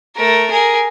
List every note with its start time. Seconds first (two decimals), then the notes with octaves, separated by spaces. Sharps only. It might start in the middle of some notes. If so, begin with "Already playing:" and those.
0.16 A3 A#4
0.51 G#4 A#4